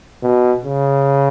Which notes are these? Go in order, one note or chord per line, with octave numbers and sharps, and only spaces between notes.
B2
C#3